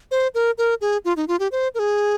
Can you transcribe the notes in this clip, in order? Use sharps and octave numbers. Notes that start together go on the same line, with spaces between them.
C5
A#4
A#4
G#4
F4
D#4
F4
G4
C5
A#4
G#4